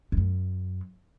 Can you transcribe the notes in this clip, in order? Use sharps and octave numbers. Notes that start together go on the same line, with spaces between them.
E2
F#2